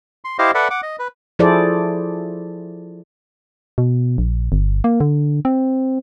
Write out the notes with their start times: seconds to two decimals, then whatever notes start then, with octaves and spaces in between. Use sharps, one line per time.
0.25 C6
0.39 E4 G4 C5 D#5 F5
0.55 A4 B4 D5 E5 F#5
0.70 F#5 D6
0.83 D#5
0.99 B4
1.39 F3 E4 G#4 A4 C5 D5
3.78 B2
4.18 A#1
4.52 G1
4.84 A#3
5.00 D3
5.45 C4